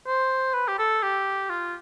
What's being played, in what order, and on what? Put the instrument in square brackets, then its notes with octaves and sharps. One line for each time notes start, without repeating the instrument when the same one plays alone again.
[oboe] C5
B4
G4
A4
G4
F4